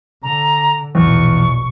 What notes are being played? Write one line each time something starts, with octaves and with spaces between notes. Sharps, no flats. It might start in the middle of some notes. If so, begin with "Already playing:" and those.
D3 A#5
A#1 E2 B2 C#6